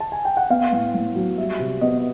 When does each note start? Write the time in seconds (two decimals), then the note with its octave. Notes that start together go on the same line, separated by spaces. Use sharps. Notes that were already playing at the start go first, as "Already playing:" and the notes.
0.00 A5
0.12 G#5
0.25 G5
0.37 F#5
0.50 B3 F5
0.72 A2
0.94 A2
1.15 F#3
1.38 G3 E5
1.59 C3
1.81 B3 D#5